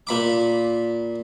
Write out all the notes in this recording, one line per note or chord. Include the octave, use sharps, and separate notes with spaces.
A#2 B5 D6